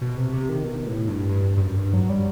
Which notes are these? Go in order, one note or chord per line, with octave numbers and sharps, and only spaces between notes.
B2
C3
C3
D#3
B2
A2
G2
G2
G2
F#2
G2
F#3
G3